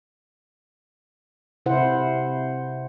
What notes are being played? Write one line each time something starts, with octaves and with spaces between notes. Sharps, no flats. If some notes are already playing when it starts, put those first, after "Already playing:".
C3 E4 C5 F#5